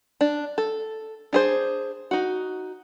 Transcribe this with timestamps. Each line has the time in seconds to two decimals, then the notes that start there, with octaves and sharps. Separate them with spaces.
0.21 D4
0.58 A4
1.33 D4 G#4 C5
2.11 D#4 F#4